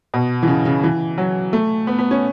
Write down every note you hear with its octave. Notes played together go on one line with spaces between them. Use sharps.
B2
E3
C#3
C#3
E3
F#3
A3
B3
B3
C#4